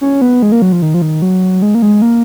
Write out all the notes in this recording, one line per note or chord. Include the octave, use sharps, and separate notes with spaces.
C#4
B3
G#3
A#3
F#3
F3
D#3
F3
D#3
F#3
G#3
A#3
G#3
A#3